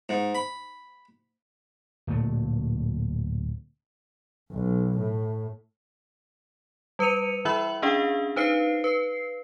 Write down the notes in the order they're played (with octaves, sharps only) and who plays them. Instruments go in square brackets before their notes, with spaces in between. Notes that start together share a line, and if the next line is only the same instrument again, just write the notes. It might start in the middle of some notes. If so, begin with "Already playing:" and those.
[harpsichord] G#2
B5
[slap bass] D1 A#2 A3
[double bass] B1
A2
[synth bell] G3 B4 C#7 D#7 F7
E3 E4 E5 B5 E6 F#7
C#4 D4 G#4 D#5 F5 G5
D#4 B4 C5 F5 C7
B4 C7